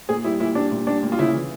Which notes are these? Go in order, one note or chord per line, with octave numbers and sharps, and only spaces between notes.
A#2 G#4
G3 E4
A#2 E4
G3 D4
A#2
G3 D4
A#2
F4
C#3 E4
E3